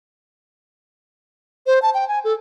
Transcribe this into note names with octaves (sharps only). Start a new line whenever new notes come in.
C5
A5
G5
G#5
A4